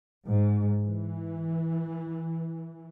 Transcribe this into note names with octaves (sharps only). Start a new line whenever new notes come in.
G#2
E3